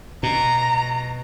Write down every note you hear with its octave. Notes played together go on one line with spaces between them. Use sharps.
B2 A#5